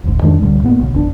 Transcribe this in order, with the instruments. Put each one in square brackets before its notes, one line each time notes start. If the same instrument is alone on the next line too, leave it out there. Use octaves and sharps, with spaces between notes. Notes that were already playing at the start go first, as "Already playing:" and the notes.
[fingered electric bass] F#1 D2 G#2
F2 D#3 G#3 D4
C#2 A2 D3 G3
G#2 A#3 B3
B1 C#3
G#1 E2 C#3 D4